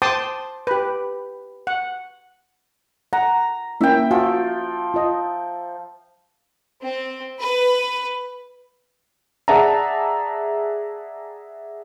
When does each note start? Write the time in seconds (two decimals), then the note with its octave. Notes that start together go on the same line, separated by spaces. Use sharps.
0.02 C5 G5 A5 C6 D6 D#6
0.67 G4 B4
1.67 F#5
3.13 F#5 A#5
3.81 A#3 C#4 E4 E5 G5
4.11 F3 F#4 G#5
4.94 F4 D#5
6.82 C4
7.39 B4
9.48 G#4 D5 E5 F#5 A5 A#5